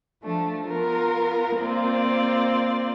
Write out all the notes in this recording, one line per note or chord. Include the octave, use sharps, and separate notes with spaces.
F3 A3 D4
B3 F4 A#4
A#3 C4 F4 D5